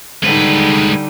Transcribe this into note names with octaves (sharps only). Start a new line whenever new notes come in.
D3 G3 G#3 D#4 B4